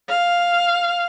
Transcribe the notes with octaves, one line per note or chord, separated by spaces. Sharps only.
F5